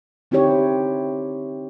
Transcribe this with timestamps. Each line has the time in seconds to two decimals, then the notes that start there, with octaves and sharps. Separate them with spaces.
0.31 D3 C4 D#4 E4 G4 C#5